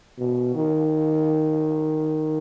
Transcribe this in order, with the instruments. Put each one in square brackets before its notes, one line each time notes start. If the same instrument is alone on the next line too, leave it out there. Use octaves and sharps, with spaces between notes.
[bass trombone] B2
D#3